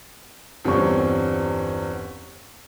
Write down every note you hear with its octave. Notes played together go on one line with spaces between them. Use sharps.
G1 E2 G3 C4 C#4 C#6